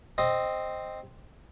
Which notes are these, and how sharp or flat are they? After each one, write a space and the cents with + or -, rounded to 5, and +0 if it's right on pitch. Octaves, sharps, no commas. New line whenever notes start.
C4 +0 D#5 -5